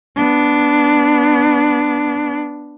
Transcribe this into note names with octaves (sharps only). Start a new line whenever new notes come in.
B3 D4